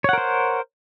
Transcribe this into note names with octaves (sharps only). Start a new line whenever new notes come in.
A#4 C5 C#5 F#5